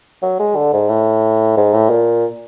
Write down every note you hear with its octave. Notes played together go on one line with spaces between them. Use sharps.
F#3
G#3
D3
G#2
A2
G#2
A2
A#2